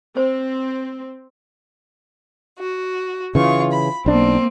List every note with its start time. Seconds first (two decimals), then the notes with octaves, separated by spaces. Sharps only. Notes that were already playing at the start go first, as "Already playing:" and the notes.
0.17 C4 C5
2.58 F#4
3.35 C#3 E3 F4 C#6
3.72 B5
4.06 B1 A#3 C4 D4